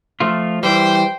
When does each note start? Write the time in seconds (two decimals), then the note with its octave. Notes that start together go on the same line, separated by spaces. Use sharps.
0.20 F3 A3 F4
0.63 E3 G3 C5 G5